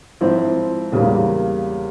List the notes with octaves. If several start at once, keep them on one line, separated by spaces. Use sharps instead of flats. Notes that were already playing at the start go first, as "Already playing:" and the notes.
G#2 F3 C4 E4
E2 C#3 G3 A#3